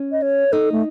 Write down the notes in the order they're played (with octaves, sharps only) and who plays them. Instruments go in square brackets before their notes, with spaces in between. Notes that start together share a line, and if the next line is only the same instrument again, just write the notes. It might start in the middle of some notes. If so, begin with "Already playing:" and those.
Already playing: [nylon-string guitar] C#4
[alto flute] D#5
C#5
[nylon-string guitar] D#4 [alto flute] A4
[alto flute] A3